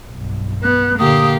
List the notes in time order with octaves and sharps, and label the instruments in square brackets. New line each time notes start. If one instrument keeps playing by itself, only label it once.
[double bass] B1 G2
[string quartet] B3 [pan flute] F#6
[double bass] A#2 D3 [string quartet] A#3 G4 F5 [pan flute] D#6